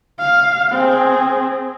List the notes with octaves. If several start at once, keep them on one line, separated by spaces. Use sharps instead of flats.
F5
C4 G#4